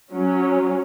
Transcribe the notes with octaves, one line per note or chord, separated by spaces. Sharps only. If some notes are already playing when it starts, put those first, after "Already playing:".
F#3 C#4